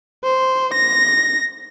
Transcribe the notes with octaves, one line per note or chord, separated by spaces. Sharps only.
C5
A#6